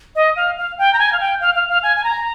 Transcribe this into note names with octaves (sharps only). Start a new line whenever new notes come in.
D#5
F5
F5
G5
A#5
G#5
F5
G5
F5
F5
F5
G#5
G#5
A#5